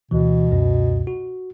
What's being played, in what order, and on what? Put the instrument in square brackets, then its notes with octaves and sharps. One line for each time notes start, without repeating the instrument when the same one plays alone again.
[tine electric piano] D2 E3 [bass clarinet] B2
[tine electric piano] C#2 F#2
F#4